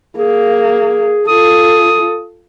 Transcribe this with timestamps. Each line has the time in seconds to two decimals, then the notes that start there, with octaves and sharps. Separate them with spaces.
0.17 A#3 G#4
1.28 F4 A4 D#6